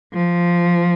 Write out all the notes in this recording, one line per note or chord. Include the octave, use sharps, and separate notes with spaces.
F3